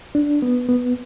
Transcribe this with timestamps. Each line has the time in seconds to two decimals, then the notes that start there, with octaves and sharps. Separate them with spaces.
0.15 D4
0.42 B3
0.69 B3